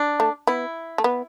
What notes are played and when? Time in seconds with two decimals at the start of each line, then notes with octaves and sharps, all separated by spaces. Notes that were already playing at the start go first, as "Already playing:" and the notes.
Already playing: D4
0.20 A3
0.47 B3 E4
0.98 A3
1.04 B3